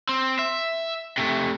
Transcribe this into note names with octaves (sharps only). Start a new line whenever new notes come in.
C4
E5
C3 A3